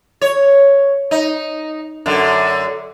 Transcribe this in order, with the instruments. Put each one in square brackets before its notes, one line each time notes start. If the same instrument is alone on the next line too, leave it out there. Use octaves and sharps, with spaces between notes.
[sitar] C#5
D#4
F#2 D3